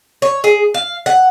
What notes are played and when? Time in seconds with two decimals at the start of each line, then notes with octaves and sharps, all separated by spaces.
0.22 C#5
0.44 G#4
0.74 F5
1.06 F#5